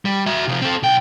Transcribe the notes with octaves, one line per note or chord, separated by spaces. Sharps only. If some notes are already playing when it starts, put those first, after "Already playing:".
G3
F#4 E5
C3 F3
C4 A4
B1 G5